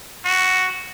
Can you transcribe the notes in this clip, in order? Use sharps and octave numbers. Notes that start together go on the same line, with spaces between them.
F#4